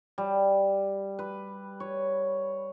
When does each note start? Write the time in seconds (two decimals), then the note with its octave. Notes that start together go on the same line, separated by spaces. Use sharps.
0.18 G3
1.19 B4
1.80 C#5